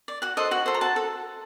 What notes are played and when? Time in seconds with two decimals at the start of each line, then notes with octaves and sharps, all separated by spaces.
0.08 D5
0.22 F#4 F#5
0.37 A4 C5 D#5
0.51 F#4 F#5
0.66 A4 C5
0.74 A#5
0.81 F#4 A5
0.96 A4